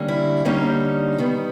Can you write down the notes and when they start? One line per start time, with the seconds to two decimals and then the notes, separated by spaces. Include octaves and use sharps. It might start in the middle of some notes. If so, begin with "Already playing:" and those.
Already playing: D3 G3 A#3 C#4
0.08 E4
0.45 D3 G3 A#3 C#4 D#4
1.18 D#3 G3 B3